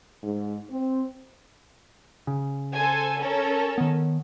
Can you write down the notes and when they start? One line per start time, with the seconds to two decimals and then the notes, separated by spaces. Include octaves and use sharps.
0.22 G#2
0.70 C4
2.27 C#3
2.72 A4 C5 G#5
3.19 C#4 A4 A#4
3.78 D#3 B3